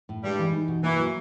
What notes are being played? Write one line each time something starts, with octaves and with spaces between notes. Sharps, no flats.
A2
G2 G3 G#3
E3
D#4
B2
E3 A#3
F#3